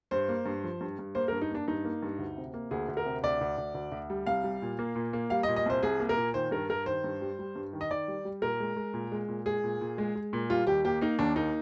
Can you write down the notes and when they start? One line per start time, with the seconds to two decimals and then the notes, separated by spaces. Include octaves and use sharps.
0.11 G2 C5
0.29 A#3
0.46 G2
0.64 F3
0.81 G2
0.99 G2
1.15 A#3 C5
1.28 A#4
1.32 G2
1.42 D#4
1.51 A#3 D4
1.68 G2 D#4
1.85 A#3
2.03 G2
2.19 D2
2.37 C3
2.54 A#3
2.71 D2 G#4
2.88 D2
2.97 A#4
3.06 C3
3.23 D2 D5
3.41 D2
3.58 D2
3.74 D2
3.92 D2
4.10 G3
4.26 C2 F5
4.44 G3
4.62 A#2
4.79 A#3
4.96 A#2
5.13 A#3
5.30 G3 F5
5.43 D#5
5.48 A#2
5.56 D#5
5.66 C2 C5
5.83 C2 G#4
6.00 A#3
6.09 A#4
6.17 A#2
6.34 D#3 C5
6.51 G2 A#4
6.69 G2 A#4
6.86 D#3 C5
7.04 G2
7.21 G3
7.39 G3
7.56 G2
7.73 D#3
7.81 D#5
7.91 D#3 D5
8.08 G3
8.25 G3
8.42 A#2 A#4
8.60 G#3
8.76 G#3
8.94 A#2
9.12 G#3
9.29 A#2
9.46 G#3 G#4
9.64 A#2
9.81 A#2
9.98 G#3
10.15 G#3
10.33 A#2
10.50 G3 F4
10.67 D#2 G4
10.85 A#3 G4
11.01 A#3 D#4
11.19 D#2 D4
11.36 A#3 D#4